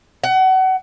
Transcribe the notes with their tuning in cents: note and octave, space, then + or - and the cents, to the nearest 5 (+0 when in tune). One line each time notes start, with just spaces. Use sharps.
F#5 +30